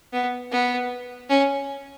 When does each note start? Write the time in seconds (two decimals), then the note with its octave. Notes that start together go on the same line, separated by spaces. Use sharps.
0.13 B3
0.52 B3
1.30 C#4